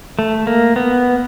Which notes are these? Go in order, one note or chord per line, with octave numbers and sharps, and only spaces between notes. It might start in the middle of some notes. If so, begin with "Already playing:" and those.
A3
A#3
B3